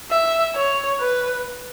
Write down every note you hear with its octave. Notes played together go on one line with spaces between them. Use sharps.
E5
C#5
B4